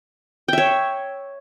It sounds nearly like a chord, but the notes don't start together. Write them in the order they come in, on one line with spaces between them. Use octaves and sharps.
G5 E5 C#5